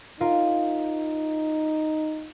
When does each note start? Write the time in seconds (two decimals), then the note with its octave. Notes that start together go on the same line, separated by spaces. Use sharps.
0.21 D#4 F4 A#4